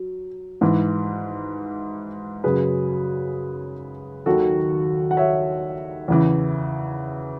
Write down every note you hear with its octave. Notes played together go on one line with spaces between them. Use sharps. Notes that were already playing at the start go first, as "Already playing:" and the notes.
Already playing: F#3
G#2 E3
F#2 C#3 F#3 G#4 B4
D#2 D#3 F#3 F#4 A4
F#5
C#5 E5
E2 C#3 E3